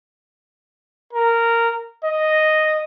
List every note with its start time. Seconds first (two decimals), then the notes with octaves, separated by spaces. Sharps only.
1.13 A#4
2.04 D#5